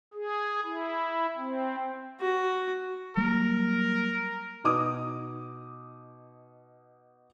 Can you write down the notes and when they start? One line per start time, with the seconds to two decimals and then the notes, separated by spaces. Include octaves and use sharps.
0.14 G#4
0.64 E4
1.37 C4
2.20 F#4
3.17 F#3 G3 A#3 A#4
4.64 B2 D#4 D6 D#6